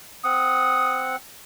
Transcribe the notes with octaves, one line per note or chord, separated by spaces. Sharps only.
C4 F#5 D#6